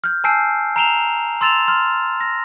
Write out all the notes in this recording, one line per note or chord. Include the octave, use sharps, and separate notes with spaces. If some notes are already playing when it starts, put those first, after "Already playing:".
F6 G6
G#5 A5 E6 G6 C7 D7
A#5 C7 D7 E7 F7 G7
C6 E6 A6 E7 F7
C6 F6
A#6